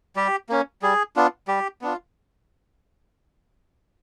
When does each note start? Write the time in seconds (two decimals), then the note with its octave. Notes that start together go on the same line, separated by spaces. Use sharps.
0.16 G3 G4
0.49 A#3 C#4
0.82 G3 G#4
1.16 B3 D4 F4
1.48 G3 G4
1.82 B3 D4 F4